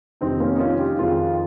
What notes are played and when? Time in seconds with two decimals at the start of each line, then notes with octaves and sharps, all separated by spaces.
0.21 F2 C3 D#3 C4 D#4
0.40 A#3 C#4
0.55 D#4
0.59 C#4 F4
0.79 D#4 G4
0.98 F2 D#3 F4 G#4